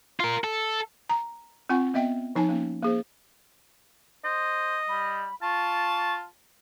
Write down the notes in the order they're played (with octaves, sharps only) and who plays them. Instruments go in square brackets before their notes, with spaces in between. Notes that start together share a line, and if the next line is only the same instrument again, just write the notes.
[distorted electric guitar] F4 A#4
A4
[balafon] A#5
C4 F4 F#5 G#5 C#6
B3 D#5 E5 G5
F3 D#4 G#5 A5
A#3 C#4
A#3 G#4 C5
[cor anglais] C5 [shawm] D#5
[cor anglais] G3 [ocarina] B5
[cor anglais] F4 [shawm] A5 [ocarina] C#6